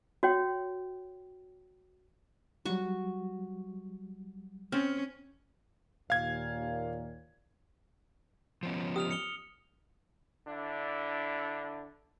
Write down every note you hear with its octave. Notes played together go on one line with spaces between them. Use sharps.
F#4 C#5 G5
F#3 G3 F#4 C#6
C4 C#4 F6
D#2 A#2 F5 G#6
F3 B3 C#4
G4 D#6 F6 F7
C#7 F7 G7
D3 D4 E4